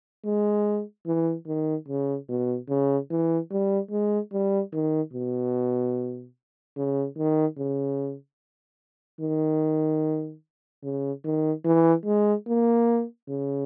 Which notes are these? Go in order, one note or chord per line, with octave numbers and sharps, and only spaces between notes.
G#3
E3
D#3
C#3
B2
C#3
E3
G3
G#3
G3
D#3
B2
C#3
D#3
C#3
D#3
C#3
D#3
E3
G#3
A#3
C#3